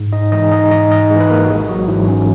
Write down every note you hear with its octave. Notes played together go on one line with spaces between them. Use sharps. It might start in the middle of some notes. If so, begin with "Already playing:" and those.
Already playing: G#2
D#4 D#5
E3 G#3 D#4 D#5
D#4 D#5
G#2 D#4 D#5
D#4 D#5
E3 G#3
B4
A#3 A#4
F#4
G#1 G#3 G#4
F#3 F#4
G#2 E3 F#3 E4
C#4